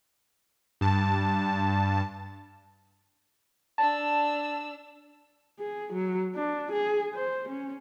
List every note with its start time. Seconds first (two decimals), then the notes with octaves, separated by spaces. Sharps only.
0.81 G2 A5
3.78 D4 A5 E6
5.59 G#4
5.93 F#3
6.35 D4
6.72 G#4
7.14 C5
7.49 C#4